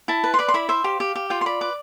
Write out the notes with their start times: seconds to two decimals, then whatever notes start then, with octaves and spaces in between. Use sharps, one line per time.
0.08 E4 A5
0.24 B4
0.34 C6
0.39 D5 B5
0.48 C6
0.54 E4 B5
0.69 C5 E5
0.84 G4 F5
1.00 G4
1.15 G4
1.30 F4 G5
1.41 C6
1.46 D5 B5
1.61 B4 D6